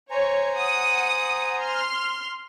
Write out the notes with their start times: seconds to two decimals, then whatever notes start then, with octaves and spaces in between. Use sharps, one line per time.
0.11 C5 C#5 G#5 A#5
0.55 F#5 D#6
1.61 C6 F6